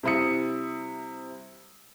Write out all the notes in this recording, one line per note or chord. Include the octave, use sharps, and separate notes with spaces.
C3 G3 E4 D#6 C#7